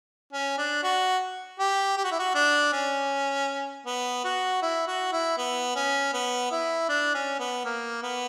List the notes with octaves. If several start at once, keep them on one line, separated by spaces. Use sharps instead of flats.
C#4
D4
F#4
G4
G4
F#4
E4
F#4
D4
C#4
B3
F#4
E4
F#4
E4
B3
C#4
B3
E4
D4
C#4
B3
A#3
B3